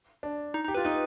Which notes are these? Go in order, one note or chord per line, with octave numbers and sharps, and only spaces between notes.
D4
D#4
D#4 G4
F4 B4
D#4 B4